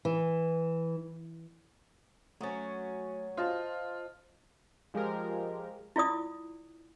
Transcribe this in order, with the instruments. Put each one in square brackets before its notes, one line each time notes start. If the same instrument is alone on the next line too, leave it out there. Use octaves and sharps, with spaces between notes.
[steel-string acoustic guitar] E3
[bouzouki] F#3 C#4 [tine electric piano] A3 D#6 A6
[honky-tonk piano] F4 [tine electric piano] C5 D#5 A5
[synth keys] F3 G#3 F4 G4 A#4
[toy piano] E4 F4 D5 D#6